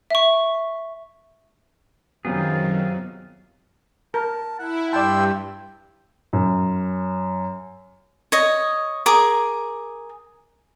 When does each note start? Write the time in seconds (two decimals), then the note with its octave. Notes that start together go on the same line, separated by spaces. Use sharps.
0.10 E5 C#6
2.25 F#2 C3 D#3 F#3 B3 C4 F4 G#4
4.14 A#4 A5
4.59 E4 F#5
4.93 G2 D5 G5 A5 C6 E6
6.33 F#2
8.32 C#5 D#5
9.06 G#4 A#4 D6